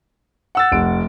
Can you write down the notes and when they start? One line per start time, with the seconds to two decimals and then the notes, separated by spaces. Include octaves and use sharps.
0.55 F#5 E6 A6
0.72 F1 D7